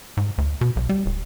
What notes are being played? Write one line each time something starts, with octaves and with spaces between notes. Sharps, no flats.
G#2
D2
B2
B1
G3
D1